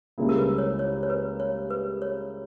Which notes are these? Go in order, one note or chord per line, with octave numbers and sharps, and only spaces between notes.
C#2 C#3 G3 A#3 E4
A#4
B4
C#5
C#5
C#5
B4
C#5
B4
C#5